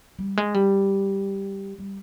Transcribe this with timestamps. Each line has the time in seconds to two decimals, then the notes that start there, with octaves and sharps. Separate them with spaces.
0.19 G3
0.37 G#3
0.54 G3
1.78 G3